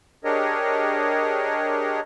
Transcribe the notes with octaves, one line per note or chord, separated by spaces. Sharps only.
D4 G4 G#4 A#4 C#5 D#5